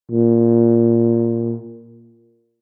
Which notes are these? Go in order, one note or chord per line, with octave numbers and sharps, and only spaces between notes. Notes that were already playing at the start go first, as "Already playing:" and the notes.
A#2